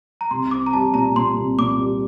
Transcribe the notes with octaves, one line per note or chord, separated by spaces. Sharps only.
A#5
C2 C6
C4 D6
A#5
G3 A5
A#2 A#5
A#2 C6
C2
A#2 D6
G3